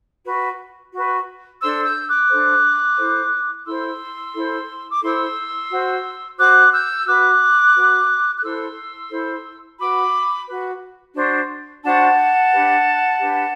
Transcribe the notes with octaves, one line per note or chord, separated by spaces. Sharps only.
F#4 B4
F#4 B4
D4 A4 C5 C6 E6
E6 G6
D6 F#6
D4 A4 C5
E4 A4 C5
E4 A4 C5 C6 E6
E4 A4 C5
D6
E4 A4 C5 C6 E6
F#4 C5
F#4 C5 D6 F#6
E6 G6
F#4 B4 D6 F#6
F#4 B4
F#6
E4 A4 C5 C6 E6
E4 A4 C5
F#4 B4 B5 D6
F#4 B4
D4 F#4 C5
D4 F#4 C5 F#5 A5
D4 G4 B4
D4 G4 B4